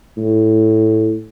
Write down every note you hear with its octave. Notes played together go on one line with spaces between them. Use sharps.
A2